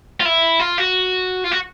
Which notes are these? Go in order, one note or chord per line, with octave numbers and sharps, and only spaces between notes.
F4
E4
F4
F#4
F4
F#4